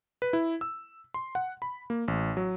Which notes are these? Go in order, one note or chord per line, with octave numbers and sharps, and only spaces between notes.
B4
E4
E6
C6
F#5
B5
A#3
A1
F#3